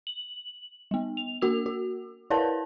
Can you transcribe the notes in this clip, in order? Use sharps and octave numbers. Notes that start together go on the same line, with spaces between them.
F#7
G3 B3
F7
A#3 F#4 E6 F7
F#4
E4 A#4 B4 C#5 D5 A5